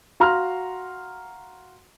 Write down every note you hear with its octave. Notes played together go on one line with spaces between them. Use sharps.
F#4 F5 A#5 C6 F6